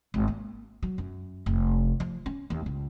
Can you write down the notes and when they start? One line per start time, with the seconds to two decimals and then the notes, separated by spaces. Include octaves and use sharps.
0.14 G#1
0.28 A#3
0.83 F#3
0.98 F#2
1.46 F1
2.00 F3
2.26 C#4
2.50 D#2
2.66 C#2